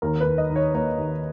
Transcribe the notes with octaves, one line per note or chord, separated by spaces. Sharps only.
D#2 A#4
B4
D#2
D#5
D#3
C#5
A#3 C#5
D#2